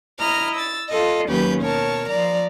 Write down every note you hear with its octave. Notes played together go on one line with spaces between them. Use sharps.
E4 D#5 A#5 F6
E6 A6
F4 A4 D#5
D#2 F#3 C#4 G4 B4 G6
B2 A#4 C#5 A5
F3 D5 A#5